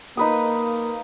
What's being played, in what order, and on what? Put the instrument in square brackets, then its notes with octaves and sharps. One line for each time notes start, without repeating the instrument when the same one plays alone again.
[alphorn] A#3 [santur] D#4 B4 D#6